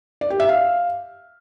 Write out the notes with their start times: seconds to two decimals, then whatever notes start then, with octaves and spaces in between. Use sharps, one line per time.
0.21 D5
0.30 G4
0.40 E5
0.49 F5